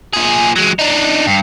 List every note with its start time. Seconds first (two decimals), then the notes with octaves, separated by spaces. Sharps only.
0.13 A#2 G#4
0.56 F#3 G#3
0.79 D4 D#4
1.27 G2